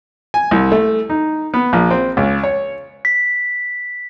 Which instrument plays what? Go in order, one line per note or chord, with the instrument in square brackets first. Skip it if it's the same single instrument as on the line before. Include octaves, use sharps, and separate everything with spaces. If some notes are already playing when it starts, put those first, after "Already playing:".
[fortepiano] G#5
C2
A3
D#4
B3
A#1
C4
C#2
C#5
[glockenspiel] B6